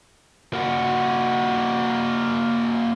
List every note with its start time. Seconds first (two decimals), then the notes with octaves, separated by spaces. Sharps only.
0.54 A#3 F#4